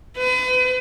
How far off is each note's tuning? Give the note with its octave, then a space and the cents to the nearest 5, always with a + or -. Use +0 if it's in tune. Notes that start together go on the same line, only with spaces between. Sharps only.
B4 +40